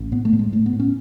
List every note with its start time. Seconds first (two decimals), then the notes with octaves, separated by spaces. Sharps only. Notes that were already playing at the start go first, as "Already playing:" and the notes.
Already playing: A1
0.12 A2 B3
0.25 A3
0.33 A2
0.39 G#3
0.52 A2 A3
0.66 B3
0.73 A2
0.80 C#4